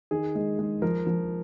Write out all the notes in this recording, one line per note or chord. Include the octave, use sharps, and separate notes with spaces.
D#3 G#4
G#3
G#3
F3 A#4
F3